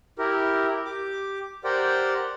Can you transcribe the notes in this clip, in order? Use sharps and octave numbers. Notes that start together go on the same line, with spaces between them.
E4 G4 A#4
G4 D6
G4 A#4 C5 D5 F#5 G5